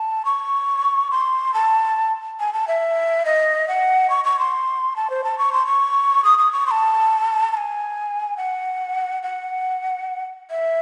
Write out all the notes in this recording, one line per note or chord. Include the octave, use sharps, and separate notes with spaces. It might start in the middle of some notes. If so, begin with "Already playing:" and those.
Already playing: A5
C#6
C6
A5
G#5
A5
E5
D#5
F#5
C#6
C#6
C6
A5
C5
A5
C#6
C6
C#6
D#6
D#6
C#6
C6
A5
A5
G#5
F#5
F#5
E5